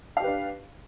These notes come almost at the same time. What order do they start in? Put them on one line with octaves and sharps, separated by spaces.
F5 G4 B4 D4